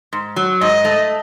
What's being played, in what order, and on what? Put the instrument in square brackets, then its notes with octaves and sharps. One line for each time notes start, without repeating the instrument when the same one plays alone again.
[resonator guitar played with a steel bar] G#2
F#3
[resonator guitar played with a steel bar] G#2 [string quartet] D#5
[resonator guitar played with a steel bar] A3